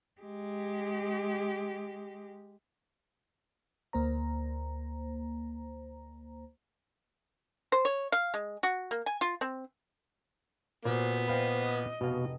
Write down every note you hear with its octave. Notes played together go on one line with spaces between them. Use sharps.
G#3 G4
D2 A#3 C5 A#5
C5
C#5
F5
G#3
F#4
A#3
G#5
F4
C4
A#2 B3 F#4 C5
B4 C5 D#5 F5 G5
D#5
F1 B2 F5